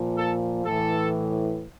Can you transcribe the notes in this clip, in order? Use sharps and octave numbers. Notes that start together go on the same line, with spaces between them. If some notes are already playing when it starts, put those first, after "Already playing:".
Already playing: A#2 F3
A4
A2 E3 A4